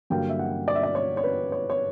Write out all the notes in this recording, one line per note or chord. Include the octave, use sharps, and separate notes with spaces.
G2 D3 F#3 A#3 G5
E5
F#5
D5
E5
D5
C#5
C#5
B4
C#5
C#5